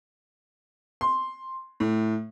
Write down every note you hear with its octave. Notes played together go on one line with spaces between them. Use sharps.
C6
A2